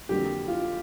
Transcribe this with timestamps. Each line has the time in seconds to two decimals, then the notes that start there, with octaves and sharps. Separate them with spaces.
0.09 F2 D3 F#3 A#3 G4
0.48 F4